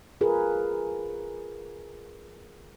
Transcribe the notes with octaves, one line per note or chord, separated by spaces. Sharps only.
F4 G#4 A#4 B4